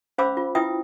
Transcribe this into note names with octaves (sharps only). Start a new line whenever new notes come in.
C#4 C5 F5 B5 D6 E6
F4
E4 F4 B4 E5 G5 D#6